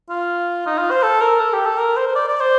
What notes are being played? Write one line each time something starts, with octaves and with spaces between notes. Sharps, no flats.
F4
D#4
F4
C5
A4
A#4
A4
G4
A4
A#4
C5
C5
D5
D5
C5